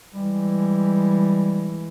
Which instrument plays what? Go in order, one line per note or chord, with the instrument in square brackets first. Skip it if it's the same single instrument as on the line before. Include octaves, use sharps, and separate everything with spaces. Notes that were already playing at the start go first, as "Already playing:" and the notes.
[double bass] E3 G#3 [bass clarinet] G3